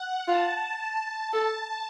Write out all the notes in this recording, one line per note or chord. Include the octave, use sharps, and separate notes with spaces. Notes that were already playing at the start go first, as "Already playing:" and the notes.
Already playing: F#5
F4 A5
A4